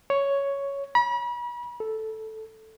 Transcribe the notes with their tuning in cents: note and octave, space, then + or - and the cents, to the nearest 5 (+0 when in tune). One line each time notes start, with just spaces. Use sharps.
C#5 +5
B5 -40
A4 +0